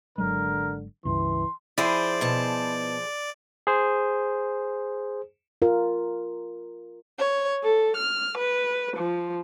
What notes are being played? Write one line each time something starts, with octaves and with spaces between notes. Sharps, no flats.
G#1 D3 F#3 G#3 A#4
C#2 G2 E3 C6
F3 E4 G#4 C5 D5
B2 A5
G#4 C5
F4 A#4
C#5
A4
F6
B4
F3